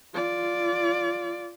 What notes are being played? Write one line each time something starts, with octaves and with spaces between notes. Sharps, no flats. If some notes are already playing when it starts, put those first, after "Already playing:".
F4 D5